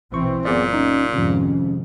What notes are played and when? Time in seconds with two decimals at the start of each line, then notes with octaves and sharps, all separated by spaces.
0.12 A#1 B2 E3 C4 C#6
0.45 F#1 A#2 B3 G#4 D5
0.73 C#4 D#4
1.13 F2 G#2 C3 D#3 F3 C#4